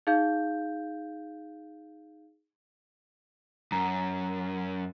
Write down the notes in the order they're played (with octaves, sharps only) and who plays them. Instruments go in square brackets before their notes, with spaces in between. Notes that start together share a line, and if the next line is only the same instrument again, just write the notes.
[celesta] D#4 G#4 F5 G6
[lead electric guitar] F#2 [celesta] A#5